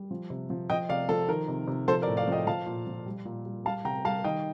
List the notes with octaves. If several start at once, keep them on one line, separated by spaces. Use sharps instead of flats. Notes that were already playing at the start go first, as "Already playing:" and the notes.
Already playing: G3
F3
C3
F3
F3 D#5 G5
C3 D5 F5
F3 A4
D#3 A#4
C3
C3
F3 A4 C5
A#4 D5
A2
D5 F5
F3 D#5 G5
F3 F5 A5
A#2
F3
G3
A#2
G3
G3 F5 A5
C3 G5 A#5
G3 F5 A5
D#3 D#5 G5